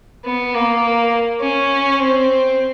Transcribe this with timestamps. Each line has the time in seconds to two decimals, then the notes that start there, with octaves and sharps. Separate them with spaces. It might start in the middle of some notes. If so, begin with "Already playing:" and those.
0.25 B3
0.54 A#3
1.41 C#4
1.99 C4